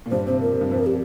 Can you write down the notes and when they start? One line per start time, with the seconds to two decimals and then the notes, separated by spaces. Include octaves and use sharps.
0.06 A#2
0.11 G2 C5
0.27 C3 C5
0.41 F3 A#4
0.52 C3
0.61 G2
0.71 F2 C5
0.79 A#4
0.86 G4